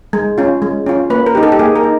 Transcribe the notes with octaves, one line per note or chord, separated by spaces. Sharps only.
G#3
C#4 F4
G#3
C#4 F4
A#3 B4
A#4
D#4 G4
A4
G4
A#3 G#4
A#4
D#4